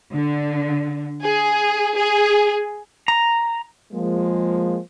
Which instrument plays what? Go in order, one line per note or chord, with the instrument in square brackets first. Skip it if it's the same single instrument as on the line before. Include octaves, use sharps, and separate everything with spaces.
[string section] D3
G#4
G#4
[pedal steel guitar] A#5
[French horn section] F3 G#3 A#3